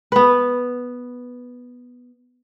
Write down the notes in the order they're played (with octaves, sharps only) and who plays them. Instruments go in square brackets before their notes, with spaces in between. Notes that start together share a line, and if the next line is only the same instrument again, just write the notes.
[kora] B3 B4